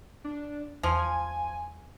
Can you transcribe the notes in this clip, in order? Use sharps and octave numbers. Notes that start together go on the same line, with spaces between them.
D4
E2 F3 G#5